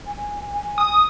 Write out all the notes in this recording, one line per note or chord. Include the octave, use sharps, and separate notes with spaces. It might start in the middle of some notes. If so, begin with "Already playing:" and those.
G#5
G#5
D#6